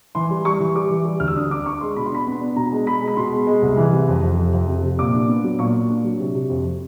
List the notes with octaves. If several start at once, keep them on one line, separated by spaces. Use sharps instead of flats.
E3 C6
G3
G3 C#6
E3
G3 D6
E3
G3
D2 F6
E6
D4 D#6
D4 D6
D4 C#6
G#3 C6
B2 B5
C6
D4 B5
B3
D4
B2 A#5
G#3
G#3 B5
G#3
B5
B2 C6
G#3
G#3
C2
E3
C3
F2
F2
C3
F2
C3
C3
A#2 D6
D4
B3
F#3
A#2 C#6
A#2
D4
F#3
C3
C3
F2